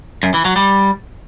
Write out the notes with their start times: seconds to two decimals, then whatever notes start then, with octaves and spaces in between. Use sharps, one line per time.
0.23 F#2
0.34 E3
0.45 F#3
0.56 G3